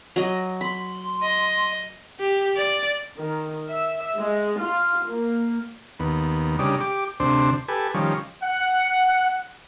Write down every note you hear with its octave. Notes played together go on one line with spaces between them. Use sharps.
F#3 D#5
B5 C6
D#5
G4
D5
D#3
E5
G#3
F4
A#3
D#2 B3
C#3 G3 D4 D#4
G4 D6
D2 C3 D4 C5
G4 A4 B4 G#5
D#3 F3 G3 C#4
F#5